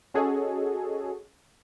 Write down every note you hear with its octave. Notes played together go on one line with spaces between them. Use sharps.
C#4 F#4 G#4 A4 C#5 D#5